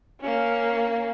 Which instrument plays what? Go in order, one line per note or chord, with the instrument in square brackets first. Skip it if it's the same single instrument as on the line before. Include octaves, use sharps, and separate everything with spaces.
[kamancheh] A#3 C#4